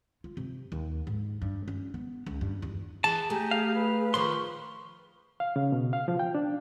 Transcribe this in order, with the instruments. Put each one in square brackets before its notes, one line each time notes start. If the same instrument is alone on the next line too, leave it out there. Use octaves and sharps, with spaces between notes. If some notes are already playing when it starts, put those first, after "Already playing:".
[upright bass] F4
C3
D#2
G#2
G2
C#4
B3
C#2
G2
E2
[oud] E3 [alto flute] G#4 [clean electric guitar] A5
[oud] A3 [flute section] G4 G#5 A#5
[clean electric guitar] F5
[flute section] B4
[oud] D#3 F3 [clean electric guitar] C6 [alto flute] C#6
[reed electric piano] F5
C#3
B2
F5
F3
G5
D4